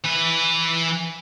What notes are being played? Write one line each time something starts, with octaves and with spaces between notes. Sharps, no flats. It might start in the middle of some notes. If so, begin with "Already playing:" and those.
E3 B4